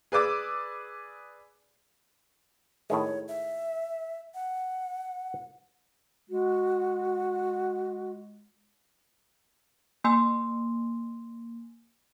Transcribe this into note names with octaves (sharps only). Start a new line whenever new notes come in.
G#4 B4 D5 D6 E6
A2 D#3 G#3 C#5
E5
F#5
G#3 F#4
A#3 G#5 C6 E6